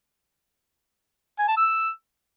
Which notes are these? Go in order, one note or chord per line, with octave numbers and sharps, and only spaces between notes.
G#5
A5
E6